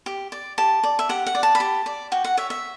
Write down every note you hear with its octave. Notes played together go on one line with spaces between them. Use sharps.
G4
D5
G4 A5
D5
E5
G4 F#5
F#5
D5
A5
B5
G4 A5
D5
F#4 G5
F#5
C#5 E5
E5